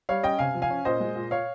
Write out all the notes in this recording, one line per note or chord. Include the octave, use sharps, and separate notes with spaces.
G3 C#5 F5
C#4 D#5 G5
C3 F5 G#5
F3
F5 G#5
C#4
A#2 C5 D#5
G#3
A#2
C#5 F5